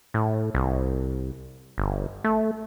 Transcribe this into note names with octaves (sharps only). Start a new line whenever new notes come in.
A2
C2
G1
A3